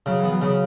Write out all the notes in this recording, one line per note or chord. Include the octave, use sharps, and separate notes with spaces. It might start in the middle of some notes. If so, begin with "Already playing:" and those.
C#3 F#3
E3 B3
F#3
C#3